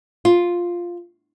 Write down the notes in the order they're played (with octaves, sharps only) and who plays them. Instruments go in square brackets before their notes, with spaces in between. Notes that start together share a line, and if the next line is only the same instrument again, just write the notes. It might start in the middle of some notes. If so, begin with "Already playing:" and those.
[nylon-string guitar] F4